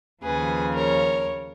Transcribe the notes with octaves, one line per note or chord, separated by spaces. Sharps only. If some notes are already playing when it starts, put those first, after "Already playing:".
D#2 C#3 F3 G#4 B4
A#4 C#5